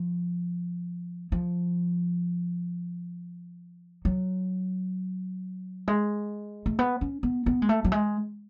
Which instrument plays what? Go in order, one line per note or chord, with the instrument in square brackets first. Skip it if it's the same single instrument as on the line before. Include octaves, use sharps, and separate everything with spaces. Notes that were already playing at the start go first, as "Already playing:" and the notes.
Already playing: [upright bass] F3
F3
F#3
G#3
A3
B3
C#4
B3
B3
G#3
A3
F#3
G#3